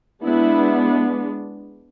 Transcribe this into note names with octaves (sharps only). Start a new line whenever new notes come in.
G#3 B3 D4 E4